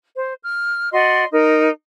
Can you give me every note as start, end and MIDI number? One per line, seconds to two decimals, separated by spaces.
0.15 0.33 72
0.42 0.88 89
0.92 1.25 66
0.92 1.25 74
0.92 1.25 75
0.92 1.25 84
1.31 1.69 63
1.31 1.69 70